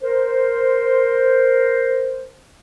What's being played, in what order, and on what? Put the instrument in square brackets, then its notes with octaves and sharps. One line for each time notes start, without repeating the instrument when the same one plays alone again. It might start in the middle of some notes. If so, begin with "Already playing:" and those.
[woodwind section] A#4 C5